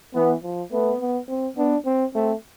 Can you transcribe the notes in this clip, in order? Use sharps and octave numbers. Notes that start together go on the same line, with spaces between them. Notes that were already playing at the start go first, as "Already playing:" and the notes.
E3 B3
F3
A3 B3
B3
C4
B3 D4
C4
A3 C4